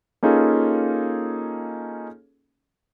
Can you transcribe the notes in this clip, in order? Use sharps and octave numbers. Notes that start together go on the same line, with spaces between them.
A#3 C#4 D#4 F4 G#4 A4